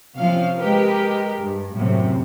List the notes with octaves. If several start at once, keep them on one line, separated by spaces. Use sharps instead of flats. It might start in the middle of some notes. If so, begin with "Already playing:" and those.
C3 F3 C#4 F5
G#3 G4 A#4 B4
G2
F#2 A2 C3